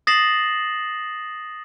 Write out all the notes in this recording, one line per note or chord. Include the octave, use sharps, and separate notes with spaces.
D#6 A6 A#6 C7 E7 F#7